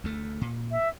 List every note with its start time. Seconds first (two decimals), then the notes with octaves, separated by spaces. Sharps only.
0.04 D2 A3
0.41 A#2
0.71 E5